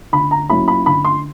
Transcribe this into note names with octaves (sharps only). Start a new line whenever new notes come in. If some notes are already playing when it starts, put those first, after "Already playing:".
D3 B5
A#5
F#3 A#3 C#4 E4 B5
B5
D3 B5
C6